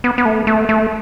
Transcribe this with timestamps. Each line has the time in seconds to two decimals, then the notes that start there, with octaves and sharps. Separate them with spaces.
0.04 B3
0.18 B3
0.25 A3
0.47 A3
0.69 A3